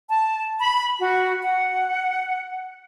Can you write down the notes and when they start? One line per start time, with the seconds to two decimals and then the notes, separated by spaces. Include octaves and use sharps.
0.09 A5
0.60 B5
1.00 F#4
1.43 F#5